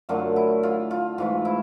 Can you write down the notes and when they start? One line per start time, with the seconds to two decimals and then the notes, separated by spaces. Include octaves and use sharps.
0.09 F#2 D3 F#3 A3 F4
0.36 E4
0.63 F4
0.91 F4
1.18 G#2 E3 A3 F4
1.45 E4